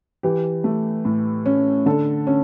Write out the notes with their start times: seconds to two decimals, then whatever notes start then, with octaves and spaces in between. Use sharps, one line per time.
0.23 E3 G4
0.64 A3
1.05 A2
1.46 C#4
1.86 D3 A4
2.27 C#4